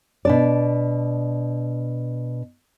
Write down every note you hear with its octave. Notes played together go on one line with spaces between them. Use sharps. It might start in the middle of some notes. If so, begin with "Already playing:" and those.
B2 D4 D5